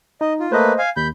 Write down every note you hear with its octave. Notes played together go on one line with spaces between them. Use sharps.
D#4 D#5
F4
A3 A#3 B4 C5 D#5
F5 G#5
D#2 B5 G6